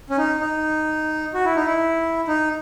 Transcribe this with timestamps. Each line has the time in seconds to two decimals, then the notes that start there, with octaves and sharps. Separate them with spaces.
0.10 C#4
0.18 D#4
0.40 D#4
1.34 F#4
1.45 E4
1.55 D#4
1.66 E4
2.28 D#4